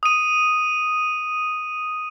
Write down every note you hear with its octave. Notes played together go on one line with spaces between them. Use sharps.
D#6 D#7